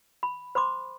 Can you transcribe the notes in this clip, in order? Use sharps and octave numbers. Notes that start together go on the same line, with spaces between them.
B5
C5 B5 C6 D6